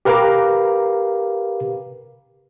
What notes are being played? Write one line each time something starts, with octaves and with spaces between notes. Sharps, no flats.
G4 A#4 B4 F5 A#5 D6